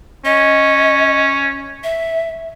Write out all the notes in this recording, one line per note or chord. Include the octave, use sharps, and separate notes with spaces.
C#4 D#5
E5